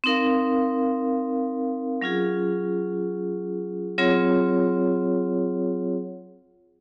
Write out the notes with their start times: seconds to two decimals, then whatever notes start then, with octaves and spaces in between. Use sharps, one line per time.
0.04 C4 D#4 A#4 F5
2.01 F#3 C#4 F4 G#4
3.98 F#3 C4 F4 G#4 C#5